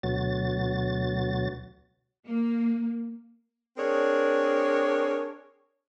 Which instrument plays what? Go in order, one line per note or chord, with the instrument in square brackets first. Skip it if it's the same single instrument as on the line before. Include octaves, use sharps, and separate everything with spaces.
[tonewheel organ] D2 B2 F#3 A6
[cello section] A#3
[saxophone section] C4 D4 G#4 A#4 C#5